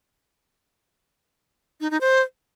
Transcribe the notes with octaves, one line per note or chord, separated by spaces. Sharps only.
D#4
D#4
C5